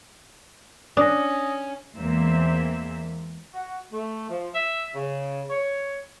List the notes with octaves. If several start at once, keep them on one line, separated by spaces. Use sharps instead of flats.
C#4 D4 D#6 A#6
E2 E3 G#3 A#3 C4 E5
F#4
A3
F3
E5
C#3
C#5